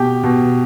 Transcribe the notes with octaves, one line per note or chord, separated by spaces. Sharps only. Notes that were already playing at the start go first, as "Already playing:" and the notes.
Already playing: B2 G4 G5
B2